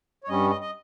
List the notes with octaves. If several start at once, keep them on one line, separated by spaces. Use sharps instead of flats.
C#5
G2 G3 C#4 D#5
D#5
D#5